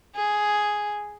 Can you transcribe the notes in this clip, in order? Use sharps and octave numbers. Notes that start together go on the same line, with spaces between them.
G#4